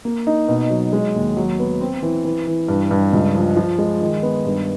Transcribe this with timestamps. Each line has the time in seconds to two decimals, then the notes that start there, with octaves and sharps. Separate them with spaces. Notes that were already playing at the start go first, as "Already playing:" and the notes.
0.05 A#3
0.27 D#4
0.48 B2
0.70 F#3
0.93 G#3
1.15 D#2
1.37 F#3
1.59 B3
1.81 C4
2.02 E3
2.25 E3
2.47 E3
2.68 G2
2.91 G2
3.13 C#2
3.34 F3
3.57 F3
3.78 G#3
4.01 D#3
4.23 B3
4.45 G2